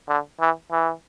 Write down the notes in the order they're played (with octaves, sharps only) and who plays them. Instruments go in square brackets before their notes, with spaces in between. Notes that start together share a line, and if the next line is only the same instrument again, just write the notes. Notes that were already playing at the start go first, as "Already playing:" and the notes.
[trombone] D3
E3
E3